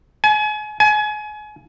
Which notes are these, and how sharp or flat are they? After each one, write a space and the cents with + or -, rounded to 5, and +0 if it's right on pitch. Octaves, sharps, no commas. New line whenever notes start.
G#5 +35
G#5 +30